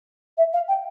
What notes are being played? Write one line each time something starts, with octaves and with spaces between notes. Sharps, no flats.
E5
F5
G5